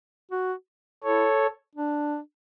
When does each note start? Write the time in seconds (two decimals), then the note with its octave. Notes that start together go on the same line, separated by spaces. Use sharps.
0.31 F#4
1.04 E4 A4 C#5
1.75 D4